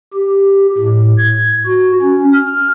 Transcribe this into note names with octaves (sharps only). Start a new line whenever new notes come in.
G4
A2
G#6
F#4
C#4
F6